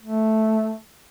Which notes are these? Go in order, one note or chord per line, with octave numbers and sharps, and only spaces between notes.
A3